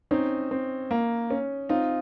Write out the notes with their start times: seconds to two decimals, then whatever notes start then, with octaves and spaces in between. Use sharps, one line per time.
0.11 C4 C#4 D#4
0.51 C4
0.91 A#3
1.30 C#4
1.69 C4 D#4 F4